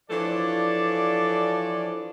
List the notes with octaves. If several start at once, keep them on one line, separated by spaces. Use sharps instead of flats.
E3 F3 D4 A4 C#5 D5